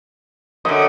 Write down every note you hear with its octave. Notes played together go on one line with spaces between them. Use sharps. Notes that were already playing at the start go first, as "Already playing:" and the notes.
F#2 D3 D#5